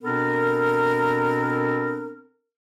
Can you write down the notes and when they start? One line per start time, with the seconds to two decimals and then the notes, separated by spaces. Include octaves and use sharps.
0.03 B2 B3 C4 D4 A4 A#4